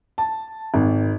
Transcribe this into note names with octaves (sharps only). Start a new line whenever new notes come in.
A5
G#1